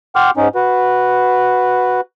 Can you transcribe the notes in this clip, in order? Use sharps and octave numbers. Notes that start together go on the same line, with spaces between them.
F#5 G5 C6 D6 F6
G#2 C#4 D#4
F#4 B4